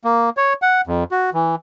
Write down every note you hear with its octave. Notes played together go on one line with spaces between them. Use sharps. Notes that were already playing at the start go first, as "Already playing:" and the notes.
A#3
C#5
F#5
F2
F#4
E3